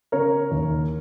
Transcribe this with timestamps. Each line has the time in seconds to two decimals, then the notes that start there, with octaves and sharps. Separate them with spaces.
0.12 C#3 A#4 C#5
0.51 D#2